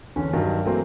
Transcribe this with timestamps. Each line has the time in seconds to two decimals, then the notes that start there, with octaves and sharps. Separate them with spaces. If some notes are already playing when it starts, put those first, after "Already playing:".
0.16 E2 D3 C#4
0.33 G2 D#3 F#3
0.65 E3 F#3 A3 A#3 C4